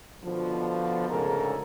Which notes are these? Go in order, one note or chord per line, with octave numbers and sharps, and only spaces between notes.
B2 D3 F3
D2 G#2 C#3 A4 A#4